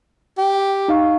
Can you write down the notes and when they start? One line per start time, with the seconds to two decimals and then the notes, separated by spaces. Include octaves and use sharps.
0.38 G4
0.88 D#4 F5 C#6